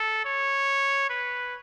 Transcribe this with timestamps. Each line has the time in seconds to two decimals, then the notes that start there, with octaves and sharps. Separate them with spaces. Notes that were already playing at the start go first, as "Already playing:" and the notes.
Already playing: A4
0.25 C#5
1.10 B4